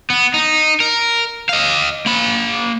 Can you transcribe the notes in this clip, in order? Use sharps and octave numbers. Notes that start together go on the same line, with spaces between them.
B3
D#4
A#4
D#5 F5
A#3 B5